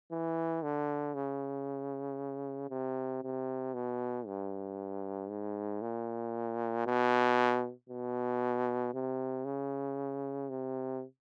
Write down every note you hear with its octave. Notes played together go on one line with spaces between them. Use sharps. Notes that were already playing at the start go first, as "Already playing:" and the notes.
E3
D3
C#3
C3
C3
B2
G2
G#2
A#2
B2
B2
C3
C#3
C3